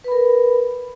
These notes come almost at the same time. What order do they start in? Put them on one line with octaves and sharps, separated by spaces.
B4 B5 A#4